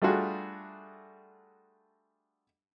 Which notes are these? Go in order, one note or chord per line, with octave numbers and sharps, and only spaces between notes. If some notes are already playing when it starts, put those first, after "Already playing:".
G3 A3 D4 F4 F#4 G#4